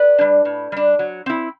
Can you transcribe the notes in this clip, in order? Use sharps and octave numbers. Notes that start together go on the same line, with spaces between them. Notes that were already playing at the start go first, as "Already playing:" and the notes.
Already playing: B4 D5
G3 D4
A2
G3 D4
F#3
C4 E4